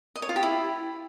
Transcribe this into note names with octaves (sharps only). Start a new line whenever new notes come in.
D#5
C#5
F4
G4
E4